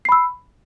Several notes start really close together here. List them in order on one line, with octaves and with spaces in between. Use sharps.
C7 B5 E6